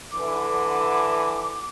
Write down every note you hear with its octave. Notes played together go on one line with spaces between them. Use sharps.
D3 E3 D6